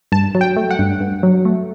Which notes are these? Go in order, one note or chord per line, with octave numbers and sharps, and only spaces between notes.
G2 A5
F#3
G5
A3
F#5
G2
G2
F#3
A3